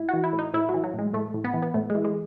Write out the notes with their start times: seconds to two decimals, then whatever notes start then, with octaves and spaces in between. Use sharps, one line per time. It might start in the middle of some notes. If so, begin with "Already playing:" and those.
Already playing: A2 E4
0.09 E3 F#4
0.24 E4
0.33 A2
0.39 D#4
0.54 A2 E4
0.69 F#3
0.74 E3
0.84 F#3
0.94 A2 G#3
1.14 A2 A3
1.34 A2
1.44 B3
1.54 E3
1.62 B3
1.74 A2 A3
1.90 G#3
1.95 E3
2.04 G#3